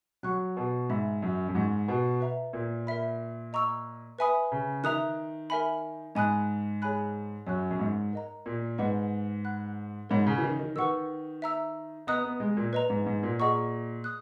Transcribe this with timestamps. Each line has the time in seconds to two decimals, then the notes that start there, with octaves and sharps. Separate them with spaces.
0.23 F#3 C#5 F#5 C#6 F#6
0.57 B2
0.89 G#2 E5 B5 E6
1.22 F#2
1.48 F#2
1.55 G#2 D#5 F#5 C#6
1.88 B2
2.21 B4 E5 A#5
2.53 A#2
2.87 A#4 E5 B5
3.53 D#5 A#5 C#6 E6
4.18 B4 E5 G#5 B5 D#6
4.52 C#3
4.84 D#3 E5 A#5 D#6 F#6
5.50 A#4 E5 G#5 B5
6.15 G#2 D#5 G#5 B5 D#6 F#6
6.82 G#4 C#5 G#5 B5 F#6
7.47 F#2 C#5 G#5 C#6 F#6
7.71 F#2
7.79 G#2
8.13 A#4 D#5 A#5
8.46 A#2
8.78 G#2 B4 D#5 F#5 B5
9.45 F#5 B5 F#6
10.10 G#2 A#4 C#5 F#5 B5
10.27 C#3
10.38 E3
10.43 D#3
10.59 D#3
10.76 D#3 B4 F#5 C#6 E6
11.42 E5 A#5 E6
12.07 B3 D#5 A#5 D#6 F#6
12.24 B3
12.40 G#3
12.57 A#2
12.73 B4 D#5 A#5
12.90 G#2
13.06 G#2
13.23 A#2
13.40 G#4 D#5 F#5 A#5 C#6
14.04 D#6 F#6